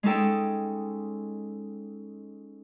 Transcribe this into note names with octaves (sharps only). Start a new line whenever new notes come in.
G#3 C#4 D#4 A4 G5